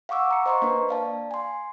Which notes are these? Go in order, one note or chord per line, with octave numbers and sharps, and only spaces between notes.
F5 F#5 C#6 D6 E6
A#5 C#7
C5 D#5 A#5 C6 C#6
A#3 D4 B4
D5 F5 A5
G#5 C6